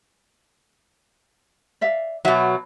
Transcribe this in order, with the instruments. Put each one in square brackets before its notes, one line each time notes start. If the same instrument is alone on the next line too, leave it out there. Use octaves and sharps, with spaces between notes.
[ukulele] D5 E5 F5
[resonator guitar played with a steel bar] B2 F#3 [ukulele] E5 F#5